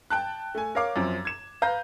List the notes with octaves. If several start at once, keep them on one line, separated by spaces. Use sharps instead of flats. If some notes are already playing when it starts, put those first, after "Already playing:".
G5 A5 F#6
A3 G#5
A#4 C#5 F5 D6
F#2 F3 C4
G#6 E7
B4 F5 A#5 G6